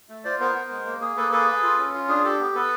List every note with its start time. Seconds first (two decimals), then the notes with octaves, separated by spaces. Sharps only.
0.09 A3
0.24 F4 C5 D5
0.40 B3 A#4 C5
0.55 B3
0.71 G#3
0.86 A#3
1.01 G#4
1.17 A#3 A4 B4
1.32 G#4 A4 B4
1.48 G#4
1.63 F4
1.78 C#4
1.94 F4
2.09 D4 G#4
2.24 G4 A4
2.39 B3
2.55 B3 A4 B4